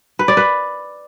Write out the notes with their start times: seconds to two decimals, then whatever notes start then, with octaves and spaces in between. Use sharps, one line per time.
0.19 B4
0.28 D5
0.37 B4